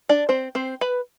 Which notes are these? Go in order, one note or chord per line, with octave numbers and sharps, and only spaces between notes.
D4 D5
C4 C5
C4 C5
B4 B5